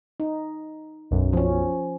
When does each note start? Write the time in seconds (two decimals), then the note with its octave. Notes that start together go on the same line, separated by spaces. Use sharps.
0.20 D#4
1.11 B1 F#2
1.33 F3 C#4